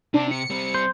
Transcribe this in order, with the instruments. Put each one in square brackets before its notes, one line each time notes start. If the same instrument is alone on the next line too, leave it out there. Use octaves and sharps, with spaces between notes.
[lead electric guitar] C3 [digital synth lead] D4
[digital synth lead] C#7
[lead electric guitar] G3 C4
[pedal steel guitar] C5